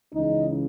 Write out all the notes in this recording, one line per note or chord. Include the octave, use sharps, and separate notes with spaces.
C#2 C#3 E3 D#4